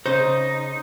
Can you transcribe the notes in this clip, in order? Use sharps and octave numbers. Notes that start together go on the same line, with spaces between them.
C#3 D#4 C5